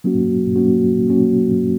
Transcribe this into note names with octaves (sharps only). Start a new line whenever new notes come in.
F#3 A#3 C#4 F#4
F#3 A#3 C#4 F#4
F#3 A#3 C#4 F#4